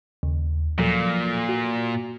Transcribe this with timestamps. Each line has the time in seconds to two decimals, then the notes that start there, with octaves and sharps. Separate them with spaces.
0.23 D#2 C#3
0.78 A#2 F3 F#3 A4
1.49 F#4